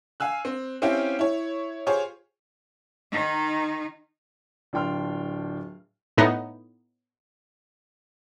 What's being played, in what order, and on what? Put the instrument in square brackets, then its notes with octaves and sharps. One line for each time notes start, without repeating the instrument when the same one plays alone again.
[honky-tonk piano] F5 G#5 E6 F#6
C4
C4 C#4 E4 G4 F5 G5
E4 C#5
F4 G4 G#4 C5 C#5
[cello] D#3 D#4
[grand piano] D1 D4 F4 G5 C6 F6
[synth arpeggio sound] A2 B3 D#4